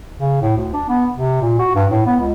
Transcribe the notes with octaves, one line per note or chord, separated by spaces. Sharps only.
C#3
A2
D2
D4
B3
C3
A#2
F#4
G2
A2
B3
C#2